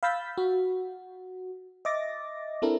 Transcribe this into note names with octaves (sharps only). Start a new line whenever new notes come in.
F5 B5 E6 G6 A6 B6
F#4
D#5 E5 D6 A6 A#6
C4 D4 E4 A4 A#4